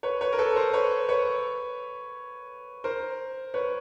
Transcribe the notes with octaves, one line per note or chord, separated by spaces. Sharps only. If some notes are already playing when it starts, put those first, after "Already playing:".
B4 C#5
B4 C#5
A#4
A4 B4
A#4 C5
B4 C#5
B4 C#5
A#4 C5
B4 C#5